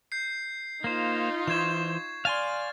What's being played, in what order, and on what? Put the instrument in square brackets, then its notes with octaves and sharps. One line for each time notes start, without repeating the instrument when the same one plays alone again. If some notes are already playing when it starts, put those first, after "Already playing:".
[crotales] G6 C7
[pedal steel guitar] A#3 C5 [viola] D#4 F4
[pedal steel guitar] E3 C5 [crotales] C#6 G#6 E7
[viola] D5 [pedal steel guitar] F5 G#5 C6 [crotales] F6 A6